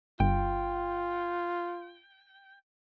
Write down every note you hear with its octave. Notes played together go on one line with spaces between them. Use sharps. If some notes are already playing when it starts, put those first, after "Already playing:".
G1 F4 G5